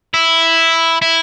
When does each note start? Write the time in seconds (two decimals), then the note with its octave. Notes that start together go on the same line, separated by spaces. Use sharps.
0.14 E4
1.02 E4